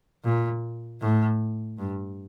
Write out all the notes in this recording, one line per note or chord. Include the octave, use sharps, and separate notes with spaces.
A#2
A2
G2